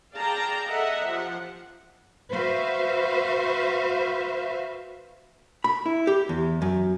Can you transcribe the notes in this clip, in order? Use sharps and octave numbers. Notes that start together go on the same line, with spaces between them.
G#4 D5 F5 G5 A5 A#5
A4 D#5 E5 F#5 A#5
F3 G4 F#5
F#4 B4 C5 E5 F5
B5
E4
G4
E2
F#2